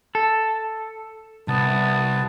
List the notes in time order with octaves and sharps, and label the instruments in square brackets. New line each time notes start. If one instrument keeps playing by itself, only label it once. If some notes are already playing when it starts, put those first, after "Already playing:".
[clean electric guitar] A4
[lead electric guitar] C2 [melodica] B3 A5